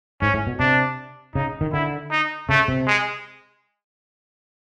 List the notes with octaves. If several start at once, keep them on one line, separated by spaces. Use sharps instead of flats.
G#2 C#4
A2
B2
C3 D4
C#3 D#4
D#3
D3 E4
D#4
C#3 A3
C3
G#3